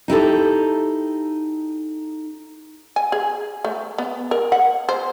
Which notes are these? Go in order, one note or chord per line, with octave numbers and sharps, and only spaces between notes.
D#4 E4 G4 A4
G#5
G#4
A3
B3
A#4
F#5
C5